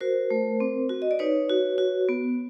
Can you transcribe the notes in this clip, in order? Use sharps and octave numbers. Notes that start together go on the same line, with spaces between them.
F#4 A#4 C5
A3
C4
F#4
D#5
D5
D#4 B4 C#5
F#4
F#4
B3